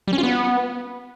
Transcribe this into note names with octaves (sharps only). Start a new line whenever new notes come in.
G3
C#4
F4
B3